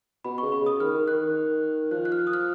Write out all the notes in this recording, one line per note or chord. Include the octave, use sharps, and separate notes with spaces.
B2 B5
C#3 C#6
B5
C#3 D#6
D#3 F6
D#3
D#3 F#6
D#3
F3 F#6
F#6
F6
F#6
D#6
F6